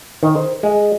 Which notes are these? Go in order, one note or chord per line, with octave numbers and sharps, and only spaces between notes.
D#3
C5
G#3